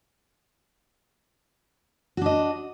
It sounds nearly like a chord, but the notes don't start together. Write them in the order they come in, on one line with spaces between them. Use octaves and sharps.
F#4 D4 D#5